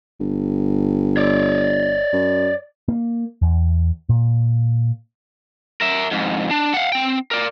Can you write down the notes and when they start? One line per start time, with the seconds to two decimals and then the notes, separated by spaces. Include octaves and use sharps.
0.20 G1
1.17 C#5 D5
2.13 F#2
2.88 A#3
3.42 E2
4.09 A#2
5.81 A#4 E5
6.11 F2 G#2
6.51 D4
6.74 F5 F#5
6.92 C4 G5
7.31 A#4 D5